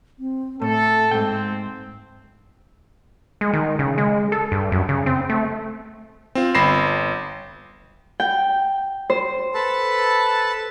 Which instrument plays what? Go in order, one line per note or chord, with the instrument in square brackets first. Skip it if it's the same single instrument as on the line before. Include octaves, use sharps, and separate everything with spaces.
[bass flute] C4
[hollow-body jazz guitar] A2 [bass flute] A3 [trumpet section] A4
[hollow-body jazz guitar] G#2 G5 [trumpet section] C4
[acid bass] G#3
D#3
C#3
G#3
A4
G2
F#2
C#3
C4
A3
[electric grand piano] C4 F4
G1 B5 A#6 C7 E7
[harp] G5
C5
[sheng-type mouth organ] A4 B4 A5